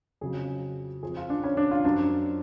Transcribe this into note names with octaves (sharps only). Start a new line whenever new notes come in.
F2 C#3 F#3 G#4
F2 F3 G#4
F4
D4
C#4
D4
F4
F#2 F3 D4